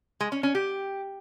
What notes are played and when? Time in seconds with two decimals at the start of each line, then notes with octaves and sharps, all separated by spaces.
0.20 G#3
0.32 C#4
0.43 C#4
0.55 G4